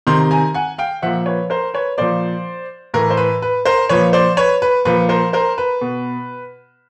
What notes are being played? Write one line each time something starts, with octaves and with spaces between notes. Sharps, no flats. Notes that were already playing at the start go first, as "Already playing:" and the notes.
C3 D#3 A#5 C6
G#5 A#5
F#5 G#5
F5 G5
A#2 F3 E5 F#5
B4 C#5
A#4 C5
B4 C#5
A#2 F3 C5 D5
A2 E3 A#4
C5
B4
B4
A#4 C5
A#2 F3 B4 C#5
C5 D5
B4 C#5
B4
A#2 F3 B4
A#4 C5
A#4 C5
B4
B2